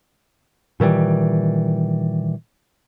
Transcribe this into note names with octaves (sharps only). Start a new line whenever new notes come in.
A#2 D#3 E3 G3